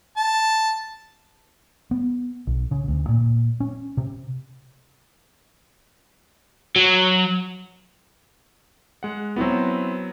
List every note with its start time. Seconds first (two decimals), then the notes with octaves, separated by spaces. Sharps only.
0.17 A5
1.91 B3
2.47 B1
2.71 C#3
2.88 D2
3.09 A#2
3.60 C#4
3.97 C3
6.76 F#3
9.03 G#3 F#5
9.36 F#3 B3 C4 E4 F#4